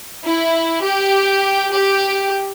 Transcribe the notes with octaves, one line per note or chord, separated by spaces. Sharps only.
E4
G4
G4